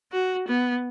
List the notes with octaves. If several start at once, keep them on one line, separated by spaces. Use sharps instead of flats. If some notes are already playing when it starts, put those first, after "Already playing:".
F#4
B3